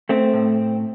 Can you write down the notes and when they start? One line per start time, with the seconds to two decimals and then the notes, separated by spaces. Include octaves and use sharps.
0.09 A3 C4
0.34 A2